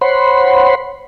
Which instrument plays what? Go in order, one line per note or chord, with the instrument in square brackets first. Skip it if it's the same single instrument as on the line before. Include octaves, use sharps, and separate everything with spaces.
[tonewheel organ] C5 C#5 F#5 B5 C6